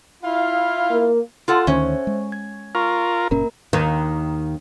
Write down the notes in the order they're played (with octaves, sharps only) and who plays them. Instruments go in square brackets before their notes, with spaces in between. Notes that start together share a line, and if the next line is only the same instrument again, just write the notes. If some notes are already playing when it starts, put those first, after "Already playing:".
[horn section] E4 F4 F5
[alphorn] A#3
[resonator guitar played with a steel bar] F4 A4 F#5
[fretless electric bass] D2 D#3 [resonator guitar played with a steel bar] C#4 [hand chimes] C5 C#5 E5
[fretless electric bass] G#3
[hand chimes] G#6
[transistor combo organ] F4 A#4 [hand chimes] C#6
[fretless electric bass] F#1 A#2 C#4 [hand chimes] A#3 A#4 A#5
[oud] D#2 D#3